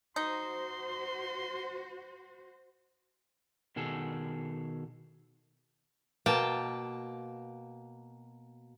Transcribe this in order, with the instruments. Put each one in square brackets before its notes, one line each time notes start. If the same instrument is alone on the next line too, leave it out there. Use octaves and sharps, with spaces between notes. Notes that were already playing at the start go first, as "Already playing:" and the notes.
[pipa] D#4 [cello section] F#4 C5 [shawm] C6
[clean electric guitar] B2 D#3 G#4 A4
[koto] B2 A#3 G5 A5